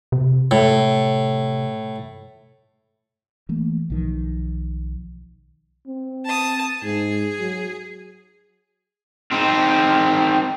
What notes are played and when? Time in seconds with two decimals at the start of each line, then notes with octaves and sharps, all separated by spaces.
0.12 C3
0.51 A2
3.49 E3 A3 A#3
3.90 B1 D#3 F3
5.87 C4
6.26 A5 D#6
6.83 G#2 G#4
7.39 F#3
9.31 D#3 C4